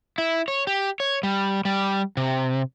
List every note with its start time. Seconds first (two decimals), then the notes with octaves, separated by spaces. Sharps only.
0.18 E4
0.48 C#5
0.67 G4
1.00 C#5
1.23 G3
1.65 G3
2.17 C3